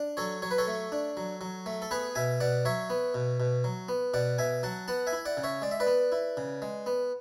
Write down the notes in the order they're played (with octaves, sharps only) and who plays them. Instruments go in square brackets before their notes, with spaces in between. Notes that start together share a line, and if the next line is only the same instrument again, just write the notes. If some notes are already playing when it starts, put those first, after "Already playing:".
Already playing: [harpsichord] D4
F#3 A4 C#5
F#3 C#5
B4
A4 C#5
A3
D4
F#3
F#3
A3
A4
B3 G#4 B4
B2 E5 G#5
B2 D5 F#5
F#3 C#5 E5
B3
B2
B2
F#3
B3
B2 D5 F#5
B2 E5 G#5
F#3 F#5 A5
B3 F#5 A5
E5 G#5
E4
D5 F#5
C#3
C#5 E5
G#3 D5
E5
B4 D5
B3
E4
C#3
G#3
B3